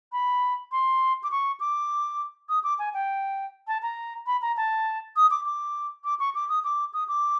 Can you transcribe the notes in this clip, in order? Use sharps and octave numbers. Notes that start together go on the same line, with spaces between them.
B5
C6
D6
C#6
D6
D#6
D6
G#5
G5
A5
A#5
B5
A#5
A5
D#6
D6
D6
D6
C#6
D6
D#6
D6
D#6
D6